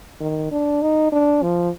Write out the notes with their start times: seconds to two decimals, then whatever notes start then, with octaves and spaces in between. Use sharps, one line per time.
0.20 D#3
0.52 D4
0.82 D#4
1.12 D4
1.43 F3